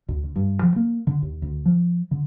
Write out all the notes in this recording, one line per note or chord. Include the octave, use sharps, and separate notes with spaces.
D2
D2
G2
F3
A#3
D3
D#2
D2
F3
D3